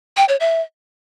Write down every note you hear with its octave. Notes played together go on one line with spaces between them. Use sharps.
G5
C#5
E5